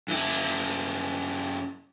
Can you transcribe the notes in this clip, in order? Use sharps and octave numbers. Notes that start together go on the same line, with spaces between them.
F#2 E4